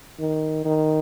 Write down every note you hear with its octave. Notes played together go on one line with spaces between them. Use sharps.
D#3
D#3